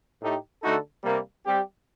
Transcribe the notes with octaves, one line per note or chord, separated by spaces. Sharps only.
A2 A3 D#4 G4
D3 A3 D#4 F#4 A4
C3 G3 A#3
G3 C4 G4